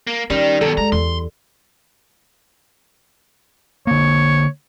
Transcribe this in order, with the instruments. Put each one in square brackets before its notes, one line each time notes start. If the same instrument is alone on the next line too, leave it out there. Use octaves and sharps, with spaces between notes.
[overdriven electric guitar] A#3
[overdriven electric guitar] D#3 [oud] G3 [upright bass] C#4
[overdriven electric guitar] F#2 B2 [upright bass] D#3 [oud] A4
[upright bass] G#3 [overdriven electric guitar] A#5
[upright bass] E2 [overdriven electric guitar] C6
[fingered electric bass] D3 A#3 [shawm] C#5